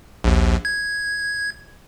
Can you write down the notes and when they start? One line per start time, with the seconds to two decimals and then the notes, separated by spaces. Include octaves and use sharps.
0.24 A#1 D#2
0.65 G#6